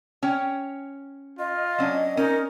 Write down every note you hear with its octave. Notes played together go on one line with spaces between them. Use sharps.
C#4 C#5 G5
F4 D#5
F#3 C#4 D4
C#4 D#4 A#4